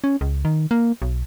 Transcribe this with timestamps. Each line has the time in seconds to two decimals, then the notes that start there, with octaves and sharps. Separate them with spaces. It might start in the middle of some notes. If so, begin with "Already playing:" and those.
0.04 C#4
0.21 C#2
0.45 D#3
0.71 A#3
1.02 B1